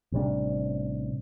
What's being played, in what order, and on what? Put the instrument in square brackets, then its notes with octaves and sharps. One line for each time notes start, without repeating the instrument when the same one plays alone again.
[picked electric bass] A1 C3 G3 D4